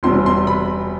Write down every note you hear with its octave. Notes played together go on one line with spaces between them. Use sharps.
E1 E2 C3 G3 C6
C6
B5